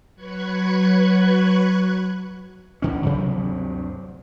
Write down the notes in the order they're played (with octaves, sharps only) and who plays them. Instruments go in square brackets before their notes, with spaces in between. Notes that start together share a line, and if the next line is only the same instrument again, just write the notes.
[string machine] F#3 B4 C#6 F#6 G#6
[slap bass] G2 D3 C#4
D2 G2 C3 F#3